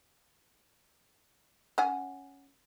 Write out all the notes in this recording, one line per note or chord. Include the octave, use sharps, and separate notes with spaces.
C#4 F#5 G#5